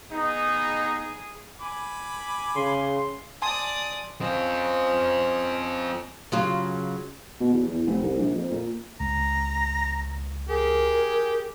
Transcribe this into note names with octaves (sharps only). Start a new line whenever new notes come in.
B3 D#4 G#4
G#5 B5 D6
C#3 C6
D5 G#5 A5 C6 D#6
C4 C#4 F4 C5 D#5
C#3 F#3 F4
B2
E2
E2
F1
C2
A#1
F2
A#2
C#2 A#5
G4 G#4 A#4